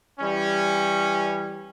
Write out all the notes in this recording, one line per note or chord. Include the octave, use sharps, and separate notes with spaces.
E3 G3 C#4